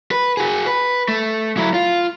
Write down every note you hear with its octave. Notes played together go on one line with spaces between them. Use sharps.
B4
F#4 G#4
B4
A3
F#3 E4
F4